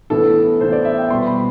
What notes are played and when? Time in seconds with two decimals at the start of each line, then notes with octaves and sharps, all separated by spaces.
0.10 A2 E3 B3 A4
0.60 A2 E3 B3 C5
0.72 D5
0.85 E5
0.98 G5
1.10 B2 G3 B3 C6
1.27 B5